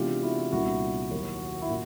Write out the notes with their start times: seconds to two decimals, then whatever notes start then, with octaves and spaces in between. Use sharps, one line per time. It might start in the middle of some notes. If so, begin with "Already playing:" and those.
Already playing: C3 E3 G#3 B3 D4 F4 G4
0.22 E4 F#4
0.52 C2 A#2 G3 B3 D4 E4 F#4
1.11 D#2 D#3 F#3
1.62 E4
1.70 A#2